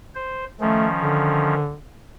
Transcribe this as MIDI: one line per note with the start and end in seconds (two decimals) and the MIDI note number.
0.15 0.44 72
0.61 1.55 51
0.61 1.55 53
0.61 0.87 57
0.61 1.55 61
1.00 1.74 50